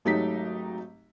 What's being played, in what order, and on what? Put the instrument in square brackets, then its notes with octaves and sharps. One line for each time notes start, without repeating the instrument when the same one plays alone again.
[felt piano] G#1 F#3 A3 D#4 G4 B6